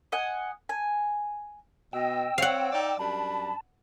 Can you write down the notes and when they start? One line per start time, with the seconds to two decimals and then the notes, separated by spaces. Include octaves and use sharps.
0.12 D#5 F#5 G#5
0.69 G#5
1.93 B2 D#5 G5 E6
2.38 C4 C#5 F5 F#5
2.72 D#4 D5
2.99 F#2 G3 D4 A5 B5